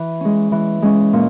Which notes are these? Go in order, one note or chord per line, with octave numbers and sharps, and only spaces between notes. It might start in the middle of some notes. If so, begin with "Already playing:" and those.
Already playing: E3
G#3 C#4
E3
G#3 C#4
A#2